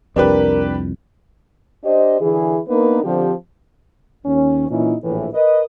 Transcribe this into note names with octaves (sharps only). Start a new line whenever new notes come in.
C2 F2 D4 G4 A#4 B4
D4 G4 C5 D#5
D3 E3 E4 G#4
A#3 B3 D4 D#4 A#4 B4
D3 F3 C4 G4
D#2 C#4
A#2 E3 C#4 D#4 E4
A#1 A2 E3
A#4 B4 D#5